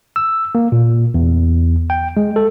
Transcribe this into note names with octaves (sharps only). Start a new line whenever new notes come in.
E6
A#3
A#2
E2
G5
G#3
A4